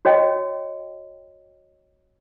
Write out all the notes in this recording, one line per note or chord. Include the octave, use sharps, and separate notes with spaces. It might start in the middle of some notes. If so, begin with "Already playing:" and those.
F#4 C#5 D#5 G5